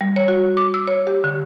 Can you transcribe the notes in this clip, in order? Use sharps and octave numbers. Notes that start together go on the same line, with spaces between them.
G3
C#5
F#4
D6
E6
C#5
G4
D3